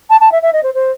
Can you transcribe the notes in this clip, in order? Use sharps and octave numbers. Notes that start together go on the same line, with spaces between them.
A5
A5
E5
E5
D#5
C5
C5